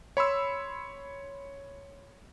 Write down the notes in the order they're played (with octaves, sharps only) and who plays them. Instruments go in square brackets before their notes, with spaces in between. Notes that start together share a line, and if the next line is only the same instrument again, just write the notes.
[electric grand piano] C#5 B5 C6 E6